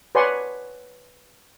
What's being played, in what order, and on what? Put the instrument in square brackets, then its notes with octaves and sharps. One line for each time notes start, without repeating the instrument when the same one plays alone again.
[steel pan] B4 C#5 D5 F#5 G#5 C6